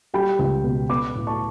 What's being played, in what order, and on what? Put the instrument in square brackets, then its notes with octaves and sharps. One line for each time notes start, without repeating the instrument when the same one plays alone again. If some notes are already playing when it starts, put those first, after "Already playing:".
[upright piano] G3 G5 B5
C#2
B2
B3 B5 D6
A2
A5 C#6